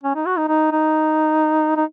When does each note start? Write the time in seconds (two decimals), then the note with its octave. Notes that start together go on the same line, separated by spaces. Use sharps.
0.04 C#4
0.15 D#4
0.26 F#4
0.37 D#4
0.49 D#4
0.72 D#4
1.76 D#4